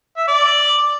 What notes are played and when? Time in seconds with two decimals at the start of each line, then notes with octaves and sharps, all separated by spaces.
0.17 E5
0.28 D5